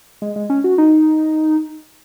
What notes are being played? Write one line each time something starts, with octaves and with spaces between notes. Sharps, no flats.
G#3
G#3
C#4
F#4
D#4